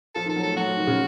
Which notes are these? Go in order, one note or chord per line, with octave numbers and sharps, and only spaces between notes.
F3 A4
D#3 A4
F#3
A3 A4
F#3 F#4
F3
D#3
C#3